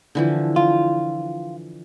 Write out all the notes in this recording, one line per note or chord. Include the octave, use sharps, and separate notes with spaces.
D3 E3 F3
F4